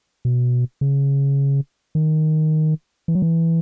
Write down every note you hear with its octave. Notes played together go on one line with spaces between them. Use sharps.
B2
C#3
D#3
E3
F#3
E3